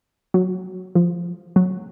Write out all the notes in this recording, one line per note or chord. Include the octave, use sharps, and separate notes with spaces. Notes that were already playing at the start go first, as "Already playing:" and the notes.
F#3
F3
F#3